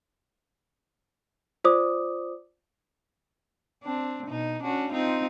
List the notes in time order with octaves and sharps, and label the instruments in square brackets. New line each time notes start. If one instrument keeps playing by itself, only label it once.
[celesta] F4 C5 D5 D6 D#6
[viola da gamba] C4 D4
B2 D#4
C#4 D4 F#4
C4 D#4 F4